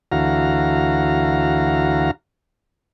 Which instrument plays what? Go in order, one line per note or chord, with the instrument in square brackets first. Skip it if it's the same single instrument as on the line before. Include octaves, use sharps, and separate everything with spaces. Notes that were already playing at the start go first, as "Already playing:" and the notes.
[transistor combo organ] D2 E3 F#4 F5 A#5